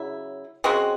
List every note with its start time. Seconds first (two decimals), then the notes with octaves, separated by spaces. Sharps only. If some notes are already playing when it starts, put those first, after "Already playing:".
Already playing: C#3 F#3 E4
0.64 C#3 G#3 C4 F#4